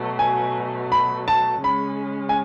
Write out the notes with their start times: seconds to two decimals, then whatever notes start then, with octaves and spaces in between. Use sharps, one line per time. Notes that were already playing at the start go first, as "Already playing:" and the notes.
Already playing: B2 F#3 A3
0.19 G#5
0.92 B5
1.28 A5
1.64 C#3 G#3 C#4 B5
2.29 G#5